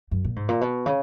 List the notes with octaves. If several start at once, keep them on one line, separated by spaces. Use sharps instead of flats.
F#2
A#2
G#2
A#2
B2
C#3